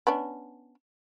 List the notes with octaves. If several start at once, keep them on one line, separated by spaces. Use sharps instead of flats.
B3 C#4 D4